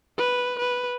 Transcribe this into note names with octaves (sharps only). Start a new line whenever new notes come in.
B4
B4